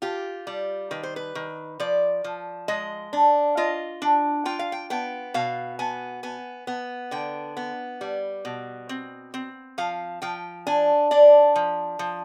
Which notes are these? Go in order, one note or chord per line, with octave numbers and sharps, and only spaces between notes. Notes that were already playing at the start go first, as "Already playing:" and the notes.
F4 G4
G3
D#3 B4
C5
B4
D#3
F3 D5
F3
G#3 D#5
D4
F4 D#5
D4
F4 G5
F5
G5
B3 G5
B2 F5
B3 G#5
B3 G#5
B3
D3 G5
B3
G3
B2
C4
C4
F3 F5
F3 G5
D4 G#5
D4 D5
F3
F3